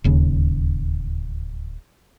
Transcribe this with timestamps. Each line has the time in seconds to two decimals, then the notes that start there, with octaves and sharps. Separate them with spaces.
0.04 D1 D#2 C#3